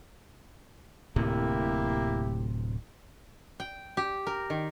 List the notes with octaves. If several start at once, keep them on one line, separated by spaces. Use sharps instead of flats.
D1 A2 C3 A#3 E4 G4
G5
G4
A#4
D#3